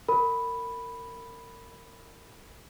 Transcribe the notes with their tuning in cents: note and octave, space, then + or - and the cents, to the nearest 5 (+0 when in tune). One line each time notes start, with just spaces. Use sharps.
A#4 -30 B5 +0